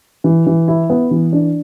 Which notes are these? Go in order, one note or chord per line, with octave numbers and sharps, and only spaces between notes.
E3
E3
E4
B3
E3
D4